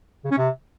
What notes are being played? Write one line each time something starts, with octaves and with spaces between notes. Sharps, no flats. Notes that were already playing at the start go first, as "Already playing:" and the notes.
C#3
C#4
C3